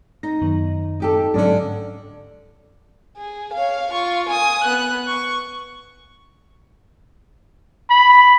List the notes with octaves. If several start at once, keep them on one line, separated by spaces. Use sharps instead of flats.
D#4 A#6
F#2 D#3 B3
D#4 G4 A4
G#2 D3 F#3 C#4 D4
G#4
C#5 F5
F4 C#6
G#5 D#6
B3 F#6
C#6
B5